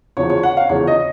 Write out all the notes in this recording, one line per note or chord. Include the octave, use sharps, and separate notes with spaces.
E2 C#3 F3 C#5
C#5
F#5
F5
E2 C#3 F3 C#5
D#5